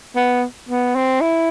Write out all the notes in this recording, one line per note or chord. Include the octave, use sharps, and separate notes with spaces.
B3
B3
C4
E4